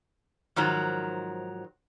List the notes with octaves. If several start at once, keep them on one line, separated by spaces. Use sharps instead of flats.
G#2 D#3 F3 F#3